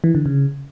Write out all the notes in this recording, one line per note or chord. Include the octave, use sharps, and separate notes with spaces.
E3
D3
C#3